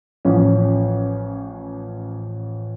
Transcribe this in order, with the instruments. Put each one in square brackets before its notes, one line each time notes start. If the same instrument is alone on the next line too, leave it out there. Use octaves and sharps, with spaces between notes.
[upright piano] A1 F3 C#4